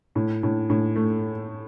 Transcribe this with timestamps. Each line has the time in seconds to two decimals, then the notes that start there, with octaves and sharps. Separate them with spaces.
0.15 A2
0.43 A2
0.70 A2
0.96 A3